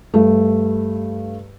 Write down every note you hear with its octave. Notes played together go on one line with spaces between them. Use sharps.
G2 A3